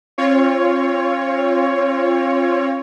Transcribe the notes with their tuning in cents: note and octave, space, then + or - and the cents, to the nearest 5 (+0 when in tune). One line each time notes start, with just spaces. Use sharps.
C4 +45 F4 -5 C#5 +10